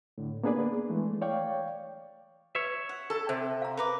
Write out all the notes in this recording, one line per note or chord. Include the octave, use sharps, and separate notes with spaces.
A2 D3
A#3 B3 D4 G#4 B4 D5
E3 G#3 A3
C#5 D5 F5 G5 C#6
B4 C#5 E5
F#5
A4 A5
C3 C5
F5 A#5
A#4 B4 B5 D6